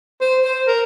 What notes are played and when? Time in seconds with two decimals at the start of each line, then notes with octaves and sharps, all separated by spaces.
0.21 C5
0.44 C5
0.67 A#4